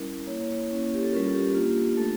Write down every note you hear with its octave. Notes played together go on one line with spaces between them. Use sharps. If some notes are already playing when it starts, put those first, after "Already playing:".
Already playing: G3 C#4 E4 A#4
A#3 E4 C#5
A#3 C#4 E4
G4
A4
G3 C#4 F4 A#4
A4
G4
A#3 D4 F4
A3 D4 F4 A4